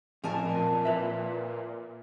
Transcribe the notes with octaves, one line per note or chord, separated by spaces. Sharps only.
F2 A2 A#4 G#5 A5
A#2
B4 E5